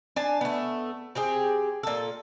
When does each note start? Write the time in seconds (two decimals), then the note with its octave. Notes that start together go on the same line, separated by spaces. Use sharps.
0.16 D4 G#5 A5
0.41 A3 B3
1.15 C4 G4 G#4
1.83 A#2 A4